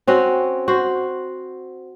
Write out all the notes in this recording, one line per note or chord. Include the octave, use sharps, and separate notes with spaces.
C4 C#4 F#4
F#4 C5